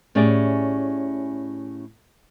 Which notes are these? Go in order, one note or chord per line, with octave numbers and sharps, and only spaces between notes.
A2 C#4 G4 G#4 D5